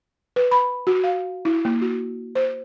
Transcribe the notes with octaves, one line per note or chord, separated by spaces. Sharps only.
B4
B5
F#4
F5
E4
A#3
F#4
C5